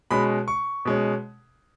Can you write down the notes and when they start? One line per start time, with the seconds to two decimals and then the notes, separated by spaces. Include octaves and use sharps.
0.11 B2 G#3 C#4 B5
0.48 C#6
0.85 B2 G#3 C#4